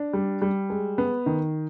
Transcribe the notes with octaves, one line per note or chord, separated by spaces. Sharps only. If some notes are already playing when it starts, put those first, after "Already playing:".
Already playing: D4
G3
G3
G#3
B3
D#3